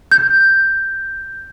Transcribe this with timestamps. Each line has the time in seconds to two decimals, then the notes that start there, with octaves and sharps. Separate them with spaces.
0.11 G6